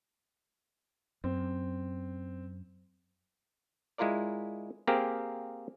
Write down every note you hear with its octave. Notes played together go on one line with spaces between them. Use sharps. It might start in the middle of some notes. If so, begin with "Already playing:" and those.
F#2 C4
G#3 E4 F4 A#4 D5
A#3 C4 G4 G#4 A#4